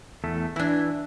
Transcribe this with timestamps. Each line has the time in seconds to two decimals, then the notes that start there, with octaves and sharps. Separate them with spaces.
0.24 E2 A3 A4
0.56 E3 D4 E4